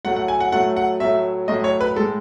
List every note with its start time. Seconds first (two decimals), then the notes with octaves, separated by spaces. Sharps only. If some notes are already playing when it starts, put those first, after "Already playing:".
0.05 A2 F#3 A3 F#5
0.16 F#5
0.28 G#5
0.40 F#5
0.52 A2 F#3 A3 F#5
0.77 F#5
1.00 A2 F#3 A3 E5
1.48 A2 F#3 A3 D#5
1.64 C#5
1.81 B4
1.96 G#3 A4
2.00 A2